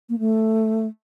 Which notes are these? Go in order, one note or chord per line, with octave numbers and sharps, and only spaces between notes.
A#3
A3